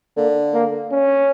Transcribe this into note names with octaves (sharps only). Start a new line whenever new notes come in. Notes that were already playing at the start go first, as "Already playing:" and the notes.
D3 A#3
A#3
C#4